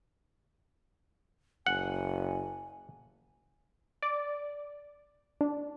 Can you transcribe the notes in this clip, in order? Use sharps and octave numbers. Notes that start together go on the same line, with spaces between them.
F#1 F#5 G#5
D5
D4